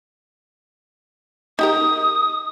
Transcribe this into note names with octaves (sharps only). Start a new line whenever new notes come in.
D#4 G4 A#4 D#6